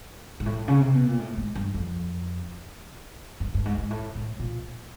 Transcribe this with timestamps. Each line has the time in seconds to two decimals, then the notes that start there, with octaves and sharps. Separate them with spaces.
0.40 G#2
0.46 A2
0.68 C#3
0.81 C3
0.94 B2
1.06 A#2
1.20 A2
1.38 G#2
1.55 G2
1.74 F2
3.40 G2
3.54 G2
3.65 G#2
3.78 G#2
3.90 A2
4.15 A2
4.40 A#2